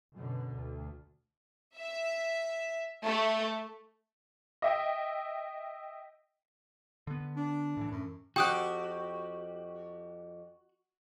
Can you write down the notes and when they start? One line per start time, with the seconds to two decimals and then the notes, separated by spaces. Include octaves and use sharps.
0.14 F#2 B2 D3
0.54 D2
1.76 E5
3.05 A3
4.62 D#5 E5 G5
7.07 D3 B3
7.37 D4
7.77 A2 E3
7.91 F#2
8.36 F2 F#4 G4 G5 D#6 F#6